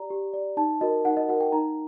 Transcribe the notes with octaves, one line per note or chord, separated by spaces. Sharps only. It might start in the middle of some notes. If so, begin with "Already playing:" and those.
Already playing: G4 D5 A#5
G4
D5
D#4 A5
F#4 A#4 D#5
D#4 F#5
D#5
F#4 A#4 F#5
G5
D#4 A#5